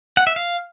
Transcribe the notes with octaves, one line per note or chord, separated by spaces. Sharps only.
F#5
E5
F5